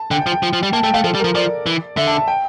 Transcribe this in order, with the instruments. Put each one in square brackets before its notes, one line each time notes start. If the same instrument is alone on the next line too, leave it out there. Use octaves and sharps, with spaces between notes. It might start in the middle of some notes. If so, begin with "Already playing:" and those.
Already playing: [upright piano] A5
[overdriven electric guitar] D3 [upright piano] G5
[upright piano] G5
[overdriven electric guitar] F3
[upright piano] G5
[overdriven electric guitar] F3
F3
[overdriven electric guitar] G3 [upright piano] G5
[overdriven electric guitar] A#3 [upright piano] A5
[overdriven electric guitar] A3 [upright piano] G5
[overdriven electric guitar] A3 [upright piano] F5
[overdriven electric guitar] F3 [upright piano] A4
[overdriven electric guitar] G3
[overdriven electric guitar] F3 [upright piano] A#4
[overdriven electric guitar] F3 [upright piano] D5
[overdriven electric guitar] E3
[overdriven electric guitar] D3 [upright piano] E5
[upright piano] A5
A5
G5